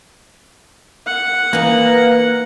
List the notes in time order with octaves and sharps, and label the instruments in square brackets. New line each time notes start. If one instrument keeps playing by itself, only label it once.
[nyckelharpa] F#5
[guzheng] E3 D#4 [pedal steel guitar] A#3